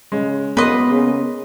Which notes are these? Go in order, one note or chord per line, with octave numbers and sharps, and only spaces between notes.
C#3 G#3
F#1 A#3 B3 B4 D#5 C6 B6
C#3